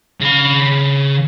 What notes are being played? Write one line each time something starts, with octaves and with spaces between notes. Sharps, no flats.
C#3 B5